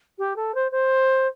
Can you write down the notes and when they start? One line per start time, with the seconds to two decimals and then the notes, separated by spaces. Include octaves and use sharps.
0.18 G4
0.36 A4
0.55 C5
0.71 C5